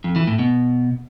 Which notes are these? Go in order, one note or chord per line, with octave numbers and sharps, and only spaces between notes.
F2
E3
A2
B2